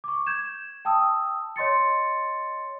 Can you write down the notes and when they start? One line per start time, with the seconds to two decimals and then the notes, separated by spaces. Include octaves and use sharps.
0.04 C#6 D6
0.26 G6 G#6 E7
0.85 G5 A5 D#6 E6
1.56 C#5 D#5 C6 A6 C#7